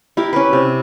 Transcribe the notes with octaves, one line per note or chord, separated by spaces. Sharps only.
E4 G4 A#4
C#4 B4
C3